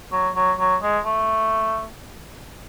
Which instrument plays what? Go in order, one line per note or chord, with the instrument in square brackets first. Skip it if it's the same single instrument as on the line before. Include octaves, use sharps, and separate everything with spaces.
[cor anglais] F#3
F#3
F#3
G#3
A3